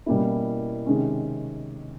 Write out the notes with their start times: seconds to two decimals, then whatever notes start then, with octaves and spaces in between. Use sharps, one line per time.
0.06 B2 G3 A#3 C#4 E4
0.86 C3 D#3 G#3 C#4